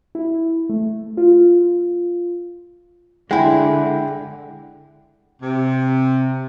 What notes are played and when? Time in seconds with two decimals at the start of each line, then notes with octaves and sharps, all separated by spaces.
0.15 E4
0.69 A3
1.17 F4
3.31 D3 G#3 E4 F#5 G5
5.42 C3